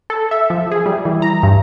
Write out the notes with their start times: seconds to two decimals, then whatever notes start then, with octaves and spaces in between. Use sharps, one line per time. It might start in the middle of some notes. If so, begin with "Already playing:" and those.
0.10 A4
0.31 E5
0.50 F3
0.72 G#4
0.86 G3
1.05 E3
1.22 A#5
1.43 G2